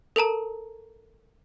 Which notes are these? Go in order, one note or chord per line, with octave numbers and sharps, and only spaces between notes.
A4 A#4 A5 A#5